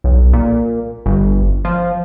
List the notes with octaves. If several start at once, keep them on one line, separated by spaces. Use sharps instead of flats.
B1
A#2
G1
F3